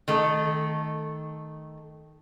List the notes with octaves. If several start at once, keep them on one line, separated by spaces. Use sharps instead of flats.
D#3 A3 A4